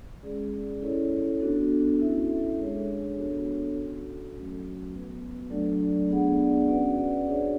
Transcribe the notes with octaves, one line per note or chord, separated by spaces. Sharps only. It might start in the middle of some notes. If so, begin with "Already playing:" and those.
G#3 C#4 G#4 D5
C#4 E4 A4 C#5
B3 D4 F#4 A4
C#4 E4 A4 E5
G#3 D4 G#4 C#5
B3 D4 F#4 A4 C#5
C#4 F#4 A4
F#3 A3 C#4 F#4
B3 F#4 B4
F#3 A3 D4 A4 D5
B3 D4 G#4 D5 F#5
C#4 F#4 B4 D5 F#5
D4 G#4 C#5 E5